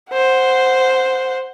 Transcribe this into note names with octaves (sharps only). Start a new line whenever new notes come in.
C5 F#5